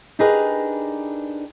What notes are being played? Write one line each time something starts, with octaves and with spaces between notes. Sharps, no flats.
D4 D#4 G4 G#4 A#4 B4